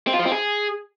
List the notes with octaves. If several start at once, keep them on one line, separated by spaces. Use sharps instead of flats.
C4
F4
F3
C4
G#4